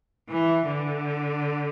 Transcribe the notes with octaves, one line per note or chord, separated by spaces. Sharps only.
E3
D3